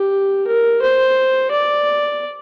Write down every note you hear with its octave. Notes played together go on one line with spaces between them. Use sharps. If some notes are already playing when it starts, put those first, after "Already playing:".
Already playing: G4
A#4
C5
D5